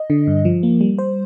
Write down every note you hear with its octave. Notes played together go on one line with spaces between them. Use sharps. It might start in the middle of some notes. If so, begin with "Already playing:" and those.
Already playing: D#5
D3
G2
F3
A#3
G3
C5